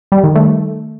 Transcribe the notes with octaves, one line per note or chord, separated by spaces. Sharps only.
G3
D#3
A3